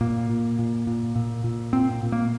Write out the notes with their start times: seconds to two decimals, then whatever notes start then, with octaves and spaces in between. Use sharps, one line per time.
0.01 A#2 A#3
0.29 A#2
0.59 A#2
0.87 A#2
1.16 A#2
1.44 A#2
1.73 A#2 C4
2.03 A#2
2.12 A#3